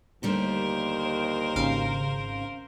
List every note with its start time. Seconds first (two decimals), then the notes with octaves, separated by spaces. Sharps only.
0.23 D#2 D3 G3 A3 A#4 C5
1.56 G#1 C#3 F5